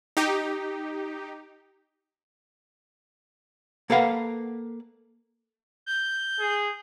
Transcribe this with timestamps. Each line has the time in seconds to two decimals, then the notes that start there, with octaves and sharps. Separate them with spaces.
0.17 D#4 G4
3.90 A#3 A4 B4 F5 F#5
5.86 G6
6.40 G#4